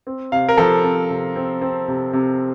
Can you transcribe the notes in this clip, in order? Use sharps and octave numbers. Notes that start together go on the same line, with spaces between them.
C4
C3 F5
A#4
F3 A4
C4
C3
C4
C4
C3
C3